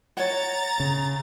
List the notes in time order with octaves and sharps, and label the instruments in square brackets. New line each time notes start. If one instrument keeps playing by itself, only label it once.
[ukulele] C#5 F#5 [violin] A#5 A6
[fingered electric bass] C#3